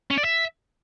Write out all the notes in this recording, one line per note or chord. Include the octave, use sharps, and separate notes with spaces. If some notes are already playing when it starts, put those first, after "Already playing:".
C#4
D5
E5